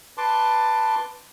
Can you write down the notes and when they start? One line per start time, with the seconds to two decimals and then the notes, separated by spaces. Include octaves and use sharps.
0.18 B4 A5 C6 D6